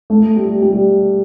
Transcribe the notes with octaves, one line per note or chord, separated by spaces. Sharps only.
A3
G3
G3